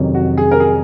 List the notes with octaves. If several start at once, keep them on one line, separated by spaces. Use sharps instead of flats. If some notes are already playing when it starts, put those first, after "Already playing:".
Already playing: F2 C3 D#3 F#3 C#4
F#4
G#4
A#4
G#4